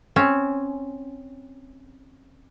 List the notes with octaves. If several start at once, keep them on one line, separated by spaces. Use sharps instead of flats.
C4 C#4